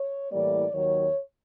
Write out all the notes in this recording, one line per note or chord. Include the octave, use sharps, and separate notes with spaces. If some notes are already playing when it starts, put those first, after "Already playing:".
Already playing: C#5
A2 E3 G3 A#3 D5
D#2 D#3 F#3 C#5